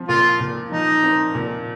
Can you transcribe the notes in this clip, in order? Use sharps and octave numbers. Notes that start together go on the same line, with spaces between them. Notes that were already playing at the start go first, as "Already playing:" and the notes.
Already playing: F3 C4
A#2 F4
A#2
F3 D#4
C4
A#2